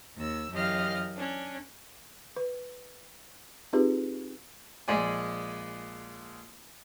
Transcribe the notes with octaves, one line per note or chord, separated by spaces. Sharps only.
D#2 E6
F#2 E3 G4 D#5 F5 F6
C#4 D4
B4
C4 D#4 F4 G4 G#4 B4
A#1 G#3 D5 G#5